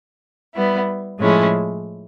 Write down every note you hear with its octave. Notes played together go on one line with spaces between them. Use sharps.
G3 B3 E4
A2 F3 G#3 C#4 E4